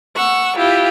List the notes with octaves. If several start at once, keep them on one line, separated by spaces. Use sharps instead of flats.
F#5 C#6 E6
E4 F4 G4